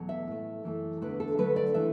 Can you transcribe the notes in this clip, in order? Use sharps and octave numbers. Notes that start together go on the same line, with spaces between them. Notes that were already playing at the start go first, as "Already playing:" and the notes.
Already playing: E2 B2 F#3 A3
E5
A2 A3
F#2 E3 A3
E2 D3 A3 B4
A4
D2 D3 F#3 A3 B4
D5
E3 A3 E5